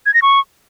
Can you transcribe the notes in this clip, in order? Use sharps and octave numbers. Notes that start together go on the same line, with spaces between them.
G#6
A#6
C#6